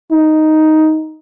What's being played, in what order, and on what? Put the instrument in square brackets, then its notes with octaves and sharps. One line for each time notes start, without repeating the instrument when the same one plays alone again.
[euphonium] D#4